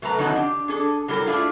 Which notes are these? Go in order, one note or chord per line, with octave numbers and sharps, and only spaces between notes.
F#3 A3 A4 B4 A#5
F2 D#3 F#3 D#4 F#5 A5
D4 G4
D4 G#4 A4
F#3 G3 E4 A4 A#4
A3 D4 E4 F4 G#4